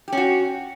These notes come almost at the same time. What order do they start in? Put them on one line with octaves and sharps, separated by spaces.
G4 C#4 F#4